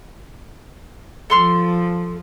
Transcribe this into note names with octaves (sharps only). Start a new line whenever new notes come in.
F3 A4 C6 F6